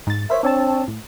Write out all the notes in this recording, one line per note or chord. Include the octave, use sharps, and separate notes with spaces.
G#2 A6
A#4 C5 C#5 E5
C4 D4 C#5 A5
A2